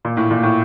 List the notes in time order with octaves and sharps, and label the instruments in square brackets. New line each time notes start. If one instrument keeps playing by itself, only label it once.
[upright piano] A#2
A2
A#2
A2